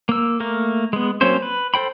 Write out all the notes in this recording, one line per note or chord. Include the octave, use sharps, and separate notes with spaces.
A#3 E6
A3 A#3 A#4
G#3 B3
F#3 A#3 C4 C#4 C5
B4
A4 C5 G5 B5